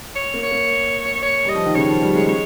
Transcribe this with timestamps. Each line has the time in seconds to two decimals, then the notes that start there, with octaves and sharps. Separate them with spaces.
0.16 C#5
0.34 A#3
0.43 C#5
0.52 A#3
1.22 C#5
1.45 G3 D#5
1.55 F3
1.65 D#3
1.75 C#3 C#5
1.89 F3
2.01 G3
2.15 G#3
2.28 G#3 C#5